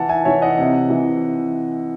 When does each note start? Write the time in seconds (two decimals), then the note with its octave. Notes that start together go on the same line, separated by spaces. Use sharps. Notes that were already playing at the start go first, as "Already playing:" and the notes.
Already playing: E3 F#5 A5
0.09 E5 G#5
0.25 E3 C#5 E5
0.42 D#5 F#5
0.58 C3
0.90 E3